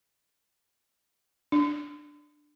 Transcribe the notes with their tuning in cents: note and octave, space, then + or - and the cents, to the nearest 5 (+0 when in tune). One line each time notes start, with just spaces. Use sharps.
D4 +15